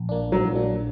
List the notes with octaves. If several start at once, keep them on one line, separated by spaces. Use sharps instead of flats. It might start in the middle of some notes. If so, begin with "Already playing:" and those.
Already playing: A#1
A#2 A#3 D4
A#1 F#3
A#2 A#3 D4